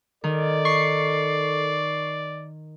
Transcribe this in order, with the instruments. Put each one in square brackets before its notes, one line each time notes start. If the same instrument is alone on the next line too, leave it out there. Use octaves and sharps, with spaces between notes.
[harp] D#3 [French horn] A4 [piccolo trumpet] D5
[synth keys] C#6 C7